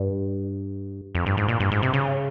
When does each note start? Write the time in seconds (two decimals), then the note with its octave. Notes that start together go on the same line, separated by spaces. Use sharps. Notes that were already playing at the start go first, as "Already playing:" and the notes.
Already playing: G2
1.15 F2
1.26 G2
1.37 G#2
1.48 A#2
1.60 G2
1.72 G#2
1.82 C3
1.93 C#3